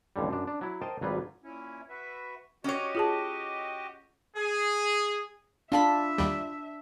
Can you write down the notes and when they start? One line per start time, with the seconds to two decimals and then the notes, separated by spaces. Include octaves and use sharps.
0.16 A1 D#2 D3 G3
0.30 F#2 D4
0.47 D4
0.61 F#3 E4
0.81 A#4 C5 D#5 G5 A5
1.01 G#1 F#3 G3 F4 B4
1.43 A#2 C#4 E4
1.89 F#4 B4 E5
2.64 C#4 F#4 G4 C#5 D#5
2.95 F4 G#4 A5
4.34 G#4
5.72 D4 F4 E5 A5 B5
6.18 D#2 G3